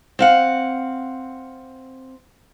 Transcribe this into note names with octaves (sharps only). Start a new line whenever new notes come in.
C4 F5 F#5